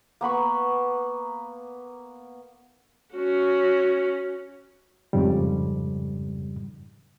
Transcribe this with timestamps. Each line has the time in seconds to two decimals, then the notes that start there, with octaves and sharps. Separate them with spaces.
0.21 A#3 B3 B5 C#6
3.15 C#4 F#4
5.13 F2 G#2 C#3 G3